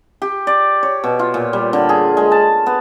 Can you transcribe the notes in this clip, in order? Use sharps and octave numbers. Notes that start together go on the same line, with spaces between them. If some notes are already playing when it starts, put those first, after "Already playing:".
G4
D5
C#5
B2
F4
A#2
G3
D3
G#4
G#3
A5
B3